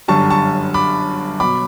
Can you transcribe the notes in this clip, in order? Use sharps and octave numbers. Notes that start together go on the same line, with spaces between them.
G1 F#2 D3 G3 A5 C#6
A5 C#6
B5 D6
B2 F#3 B5 D6